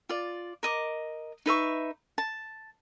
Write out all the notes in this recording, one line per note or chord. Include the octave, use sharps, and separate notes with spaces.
F4 D5
A#4 D#5 D6
D#4 B4 E5 C#6
A5